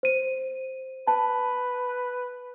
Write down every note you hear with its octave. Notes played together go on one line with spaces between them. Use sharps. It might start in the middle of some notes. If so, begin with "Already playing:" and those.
C5 D#7
B4 A5